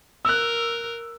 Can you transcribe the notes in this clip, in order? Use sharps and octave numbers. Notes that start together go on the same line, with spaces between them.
A#4 E6 F#6